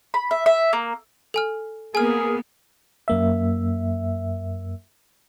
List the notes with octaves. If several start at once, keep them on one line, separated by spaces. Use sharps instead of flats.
B5
E5
E5
A#3
A4 G#5 F6
A#3 B3 G#4 A#4 G#5 F6
F#2 A#3 E5